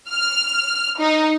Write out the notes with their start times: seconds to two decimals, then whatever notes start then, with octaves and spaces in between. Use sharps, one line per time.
0.10 F6
0.99 D#4